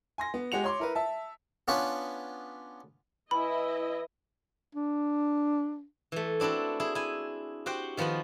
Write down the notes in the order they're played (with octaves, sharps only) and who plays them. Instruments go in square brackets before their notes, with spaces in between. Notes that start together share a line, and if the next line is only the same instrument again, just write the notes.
[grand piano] G#5 C6 A#6
B3
G#3 G4 F#5 C#7 F7
C#5 C6 D6
E4 A#4 B4
E5 A5
[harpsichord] B3 C#4 D4 F4 B4 C#5
[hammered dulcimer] E3 [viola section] E4 D#5 [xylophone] B5
[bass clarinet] D4
[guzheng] E3 A3
C4 D4 E4 F#4 A4
E4 G#4
E4 G#5
F#4 G4 C5 F#5 G5
D#3 F3 B3 F4 F#4